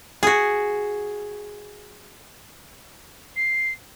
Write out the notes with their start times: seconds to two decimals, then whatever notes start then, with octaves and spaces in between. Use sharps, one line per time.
0.23 F#4 G#4
3.36 C7